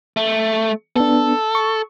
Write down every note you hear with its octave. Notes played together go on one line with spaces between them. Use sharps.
A3
B3 D4 A4
C#6